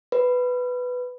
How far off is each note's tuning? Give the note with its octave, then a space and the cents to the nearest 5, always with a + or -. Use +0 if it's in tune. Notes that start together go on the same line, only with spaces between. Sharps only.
B4 +5